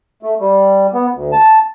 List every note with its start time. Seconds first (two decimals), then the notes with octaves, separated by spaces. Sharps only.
0.23 A3
0.40 G3
0.94 B3
1.14 D2
1.32 A5